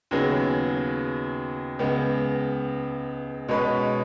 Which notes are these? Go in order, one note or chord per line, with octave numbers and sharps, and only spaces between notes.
D#2 C#3 F#3 B3 G#4
C#2 C#3 B3
B2 G#3 C#4 B4